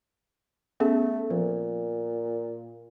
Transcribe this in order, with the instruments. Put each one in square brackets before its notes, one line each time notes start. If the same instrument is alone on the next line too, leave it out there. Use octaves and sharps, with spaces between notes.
[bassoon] A3 [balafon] B3 C#4 G#4
[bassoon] A#2 [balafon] F3